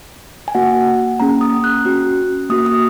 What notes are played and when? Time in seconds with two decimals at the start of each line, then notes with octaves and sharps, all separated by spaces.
0.48 G#5
0.55 A#3 F#4 F#5
1.20 A#3 C#4 G#4 A#5
1.41 D#6
1.64 F#6
1.85 C#4 F#4
2.50 A#3 F#4 D#6
2.66 D#6